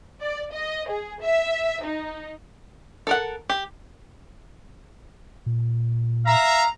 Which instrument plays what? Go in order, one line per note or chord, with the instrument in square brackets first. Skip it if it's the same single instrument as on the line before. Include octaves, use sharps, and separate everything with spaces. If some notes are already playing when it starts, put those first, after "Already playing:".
[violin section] D5
D#5
G#4
E5
D#4
[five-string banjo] A4 A#4 F#5
G4
[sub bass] A#2
[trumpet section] E5 F5 A#5